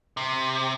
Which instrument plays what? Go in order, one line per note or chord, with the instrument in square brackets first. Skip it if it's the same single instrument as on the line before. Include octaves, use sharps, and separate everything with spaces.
[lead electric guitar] C3